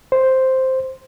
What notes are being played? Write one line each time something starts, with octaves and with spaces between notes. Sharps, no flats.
C5